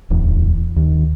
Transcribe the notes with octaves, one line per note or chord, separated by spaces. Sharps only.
D1 E2
D#2